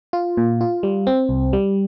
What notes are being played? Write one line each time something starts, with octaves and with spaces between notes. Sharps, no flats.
F4
A#2
F4
G3
C4
C2
G3